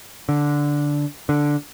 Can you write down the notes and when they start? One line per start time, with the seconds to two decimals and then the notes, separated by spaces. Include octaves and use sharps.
0.29 D3
1.29 D3